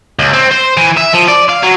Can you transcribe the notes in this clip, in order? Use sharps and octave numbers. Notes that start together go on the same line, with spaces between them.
C#2
C4
C5
E3
E5
F3
D5
F5
F#3